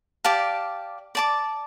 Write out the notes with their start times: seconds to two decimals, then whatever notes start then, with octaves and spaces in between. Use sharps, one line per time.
0.24 G4 D5 F5 A5
1.15 D5 A5 D6